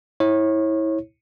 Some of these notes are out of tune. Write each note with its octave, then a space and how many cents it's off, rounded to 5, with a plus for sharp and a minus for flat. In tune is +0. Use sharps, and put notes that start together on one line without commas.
E4 -25 C#5 -30